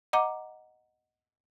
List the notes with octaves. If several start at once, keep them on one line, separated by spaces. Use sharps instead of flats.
D#5 F#5 A#5 D6